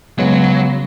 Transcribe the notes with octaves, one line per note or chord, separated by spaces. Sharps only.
C#3 F#3 G#3 B3